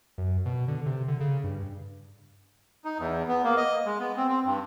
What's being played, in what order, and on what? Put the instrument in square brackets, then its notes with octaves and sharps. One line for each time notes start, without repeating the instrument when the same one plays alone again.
[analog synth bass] F#2
B2
D3
C3
D3
C#3
G2
[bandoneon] D#4
E2
B3
A#3
D#5
G#3
B3
C4
C4
G2